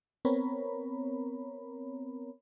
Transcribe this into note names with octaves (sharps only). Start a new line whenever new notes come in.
B3 C4 A#4 C#5 A#5 B5